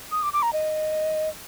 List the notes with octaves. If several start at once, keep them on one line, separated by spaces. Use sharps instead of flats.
D#6
D6
D6
A#5
D#5